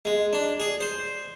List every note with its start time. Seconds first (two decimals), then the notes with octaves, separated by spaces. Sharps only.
0.05 G#3
0.33 D4
0.60 G#4
0.81 C5